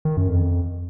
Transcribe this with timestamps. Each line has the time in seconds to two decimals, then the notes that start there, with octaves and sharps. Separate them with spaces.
0.05 D#3
0.17 F#2
0.29 F2